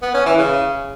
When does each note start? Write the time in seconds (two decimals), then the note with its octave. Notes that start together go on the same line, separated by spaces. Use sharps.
0.02 B3
0.14 C#4
0.26 E3
0.38 C#3